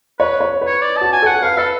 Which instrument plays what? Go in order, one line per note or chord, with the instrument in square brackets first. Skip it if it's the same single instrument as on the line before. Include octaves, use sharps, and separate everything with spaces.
[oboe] B4 [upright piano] C#5
[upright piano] C#5
B4
[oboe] C#5
D5
[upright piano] F#4 [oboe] A5
[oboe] G#5
[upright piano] A4 [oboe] F#5
[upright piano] B4 [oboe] F5
[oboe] A4 [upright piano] B4